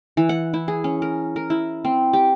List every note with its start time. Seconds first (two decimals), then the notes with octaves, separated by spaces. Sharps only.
0.17 E3
0.29 F#5
0.53 E4
0.68 G#4
0.84 C#4
1.02 A#4
1.36 A#4
1.50 E4
1.85 C4
2.13 G4